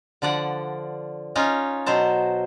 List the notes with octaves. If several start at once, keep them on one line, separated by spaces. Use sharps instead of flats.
D3 F3 D5 F#5
C#4 D#4 F4
B2 F#3 C5 A5